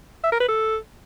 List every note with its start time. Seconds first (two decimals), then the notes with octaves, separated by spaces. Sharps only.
0.23 E5
0.32 A#4
0.40 B4
0.48 A4